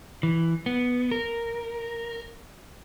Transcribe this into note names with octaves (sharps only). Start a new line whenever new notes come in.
E3
B3
A#4